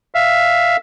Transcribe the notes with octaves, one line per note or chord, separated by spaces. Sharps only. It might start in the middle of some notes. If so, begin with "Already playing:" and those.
E5 F5